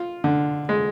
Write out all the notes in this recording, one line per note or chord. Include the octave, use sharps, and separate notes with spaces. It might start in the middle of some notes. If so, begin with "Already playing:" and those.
Already playing: F4
D3
G#3